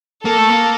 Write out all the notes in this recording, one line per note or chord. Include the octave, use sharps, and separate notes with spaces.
A#3 A4
A3
A#3